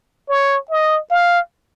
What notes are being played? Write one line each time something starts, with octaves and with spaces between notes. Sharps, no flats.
C#5
D#5
F5